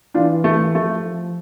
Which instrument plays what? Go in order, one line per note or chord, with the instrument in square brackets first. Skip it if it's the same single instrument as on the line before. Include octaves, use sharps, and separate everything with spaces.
[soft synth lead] E3 [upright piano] D4 F4
[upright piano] A3
[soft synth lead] F3 [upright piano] A3